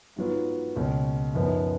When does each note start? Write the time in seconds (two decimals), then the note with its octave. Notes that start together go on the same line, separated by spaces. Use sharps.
0.16 G#2 F#3 B3 F4
0.75 C#2 B2 A#3 C#4
1.34 F#2 F3 B3 D#4